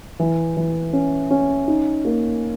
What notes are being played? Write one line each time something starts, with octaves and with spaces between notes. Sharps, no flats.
E3
E3
C#4
C#4
D#4
A#3